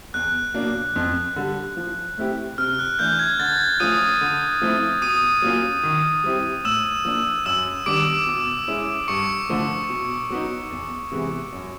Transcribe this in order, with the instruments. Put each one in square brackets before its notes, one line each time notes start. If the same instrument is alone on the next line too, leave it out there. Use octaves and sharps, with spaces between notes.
[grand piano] E2 [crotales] F#6
[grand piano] B2 F#3 A#3 D4
F2
D3 G3
F3
A3 C4 E4 G4
[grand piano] C3 [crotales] F6
[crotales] F#6
[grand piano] E3 A3 D4 [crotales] G6
[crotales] G#6
[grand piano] D3 [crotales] A6
[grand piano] F3 A3 C#4 F4 [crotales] D#6 D#7
[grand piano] D3
F3 A3 C4 E4
[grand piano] B2 [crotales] D#6 D#7
[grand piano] F#3 A#3 C#4 F4
D#3
G3 C4 E4 G4
[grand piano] A2 [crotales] E6 E7
[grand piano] F3 A#3 D4
[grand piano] F#2 [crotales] E6 E7
[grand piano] D#3 G3 B3 D4 [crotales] D6 D7
[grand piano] B2
G#3 C#4 E4
[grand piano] G2 [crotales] C#6 C#7
[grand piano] D3 F3 A3
B2
F#3 B3 D#4
E2
C3 E3 G#3 B3
F#2